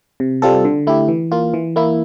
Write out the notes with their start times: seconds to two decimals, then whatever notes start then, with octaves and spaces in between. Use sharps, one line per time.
0.20 C3
0.42 G3 C4 F4 A4
0.65 D3
0.87 A3 E4 G4
1.08 E3
1.32 A#3 F4
1.54 E3
1.76 A#3 E4